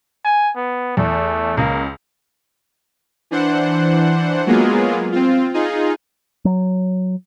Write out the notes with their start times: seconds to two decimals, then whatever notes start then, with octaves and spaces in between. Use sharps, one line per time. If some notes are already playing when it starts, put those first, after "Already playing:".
0.25 G#5
0.56 B3
0.97 E2 A3
1.57 C#2 A#3
3.31 E3 D4 C5 F#5
4.46 F#3 G#3 A#3 B3 F4 G#4
5.12 C4 F4
5.54 D#4 F4 G#4
6.45 F#3